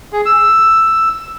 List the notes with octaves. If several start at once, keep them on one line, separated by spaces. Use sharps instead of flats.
G#4
E6